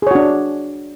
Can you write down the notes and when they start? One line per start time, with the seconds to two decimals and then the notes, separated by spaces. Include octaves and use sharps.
0.02 G#4
0.07 C#5
0.11 F#4
0.15 D4